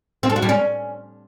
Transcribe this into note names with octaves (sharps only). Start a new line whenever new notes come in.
C4
A4
F#4
G3
C#4